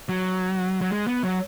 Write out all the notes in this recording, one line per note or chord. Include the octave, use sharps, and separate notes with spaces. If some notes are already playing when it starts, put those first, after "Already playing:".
F#3
F#3
G#3
B3
F#3